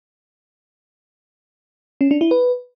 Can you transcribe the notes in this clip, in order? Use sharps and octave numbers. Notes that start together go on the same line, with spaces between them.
C#4
D4
E4
B4